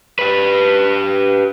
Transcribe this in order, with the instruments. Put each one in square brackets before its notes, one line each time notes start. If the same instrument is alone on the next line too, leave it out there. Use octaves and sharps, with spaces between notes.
[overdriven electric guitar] G4 B4